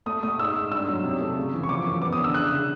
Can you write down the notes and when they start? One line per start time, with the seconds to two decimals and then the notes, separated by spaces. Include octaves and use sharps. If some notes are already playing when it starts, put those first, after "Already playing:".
0.06 A3 D#6
0.23 A3 D#6
0.40 G#2 E6
0.56 G#2
0.71 G2 E6
0.88 F#3
1.04 C3
1.21 A3
1.37 C#3
1.54 E3
1.63 C#6
1.69 F3 D6
1.86 F#2
2.02 B3 D6
2.13 D#6
2.19 D3
2.24 E6
2.34 C#3 F#6
2.52 C#3